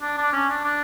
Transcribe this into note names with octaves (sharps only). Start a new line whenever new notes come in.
D4
D4
C#4
D4
D4